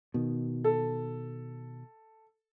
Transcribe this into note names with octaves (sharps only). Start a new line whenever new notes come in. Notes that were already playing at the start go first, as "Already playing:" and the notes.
B2 D#3
A4